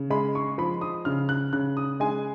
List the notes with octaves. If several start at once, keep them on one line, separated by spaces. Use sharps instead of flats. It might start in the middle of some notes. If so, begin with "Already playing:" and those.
Already playing: C#3
G#3 B5
C#6
F3 B5
D#6
C#3 F6
F#6
C#3 F#6
D#6
G#3 G#5